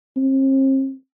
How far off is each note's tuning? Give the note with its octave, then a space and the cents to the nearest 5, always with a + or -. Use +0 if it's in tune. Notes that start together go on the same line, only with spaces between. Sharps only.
C4 +40